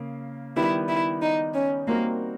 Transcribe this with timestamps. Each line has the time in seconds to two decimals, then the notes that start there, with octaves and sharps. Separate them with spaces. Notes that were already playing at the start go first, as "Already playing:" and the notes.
Already playing: C#3 A#3
0.56 D#3 G3 B3 E4
0.89 E4
1.21 D#4
1.54 C#4
1.87 G3 A#3 C4 D#4 F#4 A#4